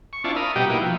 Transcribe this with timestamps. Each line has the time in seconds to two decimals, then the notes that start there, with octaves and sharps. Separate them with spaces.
0.13 C#6
0.24 C4 D4 E4 F4 A5 C#6
0.36 A#4 F5 B5 D#6
0.56 B2 G3 F#4 G4 D#5 G5
0.70 A#3 D#4 E4 F#4 B4
0.82 F3